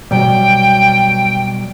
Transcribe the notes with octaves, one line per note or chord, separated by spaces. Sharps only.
B2 F#3 G3 G5